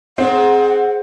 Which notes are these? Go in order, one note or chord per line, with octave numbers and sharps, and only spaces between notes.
G#2 C4 F#5